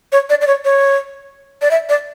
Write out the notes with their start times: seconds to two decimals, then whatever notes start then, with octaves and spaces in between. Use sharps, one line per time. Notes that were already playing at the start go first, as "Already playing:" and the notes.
0.12 C#5
0.30 D5
0.41 D5
0.47 C#5
0.65 C#5
1.62 D5
1.71 E5
1.89 D5